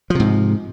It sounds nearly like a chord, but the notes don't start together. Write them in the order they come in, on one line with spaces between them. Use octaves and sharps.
F3 C3 G#2